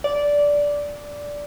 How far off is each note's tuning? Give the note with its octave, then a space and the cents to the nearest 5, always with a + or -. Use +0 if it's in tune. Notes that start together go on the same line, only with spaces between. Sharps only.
D5 -10